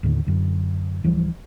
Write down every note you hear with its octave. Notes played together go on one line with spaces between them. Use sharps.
D#2 A2 D3
F#2 D3
D1 E3 F3 G3